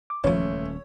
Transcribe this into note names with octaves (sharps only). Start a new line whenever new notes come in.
D6
D#1 C#2 E3 F3 A3 C#4 C#5